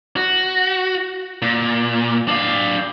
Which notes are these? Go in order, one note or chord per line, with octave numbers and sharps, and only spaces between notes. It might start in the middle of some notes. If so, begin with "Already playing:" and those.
F#4
A#2
D4 F5